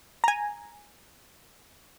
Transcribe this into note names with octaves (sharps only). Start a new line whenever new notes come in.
G#5 A#5